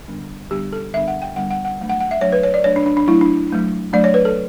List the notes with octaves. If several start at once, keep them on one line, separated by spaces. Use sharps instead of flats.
D3 G3 B3 D4
D3 G3 B3 D4 G4
A4
D3 G3 B3 D4 E5
F#5
G5
D3 G3 B3 D4 F#5
F#5
F#5
F#3 A3 D4
F#5
F#5
E5
F#3 A3 D4 C#5
B4
C#5
D5
F#3 A3 D4 C#5
D4
D4
D4
F#3 A3 D4 E4
D4
F#3 A3 D4
F#3 A3 D4 D5
C#5
B4
A4